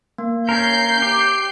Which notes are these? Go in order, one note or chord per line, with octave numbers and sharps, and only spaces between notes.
A#3
C#4 A#4 G6 C7
G4